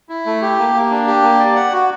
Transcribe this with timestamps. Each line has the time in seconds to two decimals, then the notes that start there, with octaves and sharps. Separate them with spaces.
0.09 E4
0.26 A3
0.42 G4
0.59 A#3
0.74 A#3
0.90 D4
1.07 G4
1.23 A#3
1.39 D5
1.55 F#5
1.72 F#4